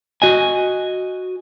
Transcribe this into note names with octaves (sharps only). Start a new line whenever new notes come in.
F#4 D#5 G#5